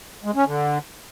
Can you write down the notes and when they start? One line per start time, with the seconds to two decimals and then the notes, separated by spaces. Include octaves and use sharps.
0.24 G#3
0.35 C#4
0.46 D3